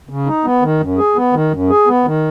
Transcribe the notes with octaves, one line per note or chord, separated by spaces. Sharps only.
C#3
D#4
B3
D#3
F#2
G#4
B3
D#3
F#2
G#4
B3
D#3